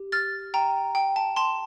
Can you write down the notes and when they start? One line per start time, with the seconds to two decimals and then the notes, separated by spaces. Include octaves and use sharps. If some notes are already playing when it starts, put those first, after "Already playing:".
Already playing: G4
0.12 F6 A6
0.54 G5 A#5
0.95 G5
1.16 A5
1.36 A5 C6